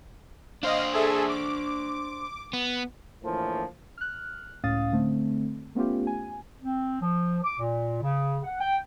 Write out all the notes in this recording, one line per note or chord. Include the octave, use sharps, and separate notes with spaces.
D4 C5 D#5 F5
G#4 A4 E5
D6
B3
A2 D3 E3 F3 A#3 F4
F6 F#6
C#2 A2 C#4 F5 D#6 A6
D3 A3 C4
A3 B3 C#4 F4 G4
G#5
C4
F3
D6
A#2
C#3
F#5
G5